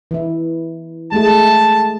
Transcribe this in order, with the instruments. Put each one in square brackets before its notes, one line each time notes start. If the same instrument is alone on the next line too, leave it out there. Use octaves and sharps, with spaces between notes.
[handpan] E3 E4
[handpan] G#3 A3 G#4 [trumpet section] A5